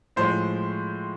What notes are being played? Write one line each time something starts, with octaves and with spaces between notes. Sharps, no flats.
A2 F3 G#3 C5